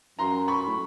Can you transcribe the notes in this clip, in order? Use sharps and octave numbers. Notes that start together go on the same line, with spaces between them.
F#2 A#5 C6
B5 C#6
A2